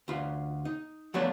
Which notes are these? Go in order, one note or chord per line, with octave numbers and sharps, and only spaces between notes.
D2 F4
D#4
F3 A3 B3 D4 C#5 D5